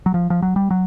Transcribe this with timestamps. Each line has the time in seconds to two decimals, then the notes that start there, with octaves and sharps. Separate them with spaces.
0.06 F#3
0.14 F3
0.30 F3
0.42 F#3
0.56 G3
0.71 F#3